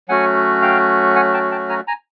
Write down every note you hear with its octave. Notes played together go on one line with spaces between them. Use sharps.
F#3 A3 C#4 F#4 F#5 G#5
F5 G5
F#5 G#5
G5 A5
G5 A5
G#5 A#5
G#5 A#5